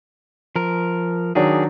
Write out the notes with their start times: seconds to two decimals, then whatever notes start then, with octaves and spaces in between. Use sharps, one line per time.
0.56 F3 A#4
1.35 D#3 F#3 D4 G#4